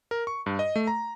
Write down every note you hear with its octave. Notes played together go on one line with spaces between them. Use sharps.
A#4
C#6
G2
D#5
A3
A#5